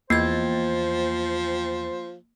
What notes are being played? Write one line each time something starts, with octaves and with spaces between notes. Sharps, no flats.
E2 F3 A#3 C5 G5 G#6 A6